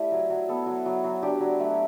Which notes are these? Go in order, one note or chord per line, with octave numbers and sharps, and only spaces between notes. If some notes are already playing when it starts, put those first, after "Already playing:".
Already playing: A3 E4 G4 D5 E5
F#3
F#3
B3 A4
F#3
F#3
F#3
D4 G4
F#3
A3